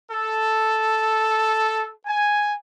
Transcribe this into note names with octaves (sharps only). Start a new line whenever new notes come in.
A4
G#5